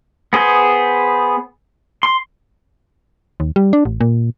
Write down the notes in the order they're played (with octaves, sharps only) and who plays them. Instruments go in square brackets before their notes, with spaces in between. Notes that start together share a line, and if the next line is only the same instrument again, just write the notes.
[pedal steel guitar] B3 G#4 C5
C6
[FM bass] D#2
G3
D4
A1
A#2